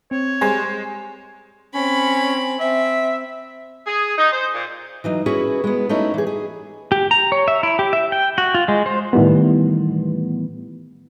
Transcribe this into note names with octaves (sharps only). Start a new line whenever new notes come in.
C4 C#5
G3 G#3 C5 G#5
C4 C#4 B5
C4 E5
G#4
D#4
C5
A#2
E3 F#3 D#4
C#4 E4 F#4 G#4 B4
G#3 B3
A3 C#4 D#4 E4 F#4
E3 G#4
G#4
G4
A#5
C#5
E5
E4
G4
E5
G5
F#4
F4
G#3
C5
A2 D#3 E3 G3 B3